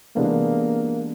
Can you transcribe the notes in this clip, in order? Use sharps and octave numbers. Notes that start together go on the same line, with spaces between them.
C3 E3 G#3 A#3 B3 D4